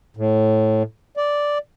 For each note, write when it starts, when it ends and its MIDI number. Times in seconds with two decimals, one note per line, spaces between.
0.17 0.83 45
1.17 1.58 74